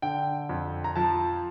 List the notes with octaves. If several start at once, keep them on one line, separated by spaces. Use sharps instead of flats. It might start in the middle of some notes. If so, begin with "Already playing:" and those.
D3 G5
F2
A#5
F3 A5